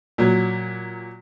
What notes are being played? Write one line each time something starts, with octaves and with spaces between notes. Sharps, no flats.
A#2 F#3